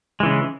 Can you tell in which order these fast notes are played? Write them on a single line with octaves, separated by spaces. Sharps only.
G#3 E3 C#3